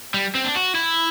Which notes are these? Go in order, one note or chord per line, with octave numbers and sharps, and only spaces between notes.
G3
C4
D4
F#4
E4